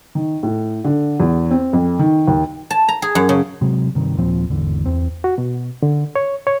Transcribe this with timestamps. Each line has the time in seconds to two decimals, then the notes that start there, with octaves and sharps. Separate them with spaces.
0.15 D#3
0.43 A2
0.84 D3
1.20 E2
1.51 C4
1.73 F2
1.99 D#3
2.28 D#2
2.71 A5
2.89 A#5
3.02 G#4
3.15 F#2
3.29 C#3
3.61 C3 F#3 G#3
3.95 G2 C3 D#3
4.18 D#1 A#2 F3 C4
4.50 G#1 E2 D3
4.86 E2 C4
5.24 F#4
5.38 B2
5.83 D3
6.16 C#5
6.47 C#5